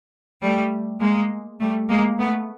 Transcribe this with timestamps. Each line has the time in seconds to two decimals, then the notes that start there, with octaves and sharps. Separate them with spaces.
0.42 G3 A3
1.01 G#3 A#3
1.60 G3 A3
1.89 G#3 A#3
2.19 A3 B3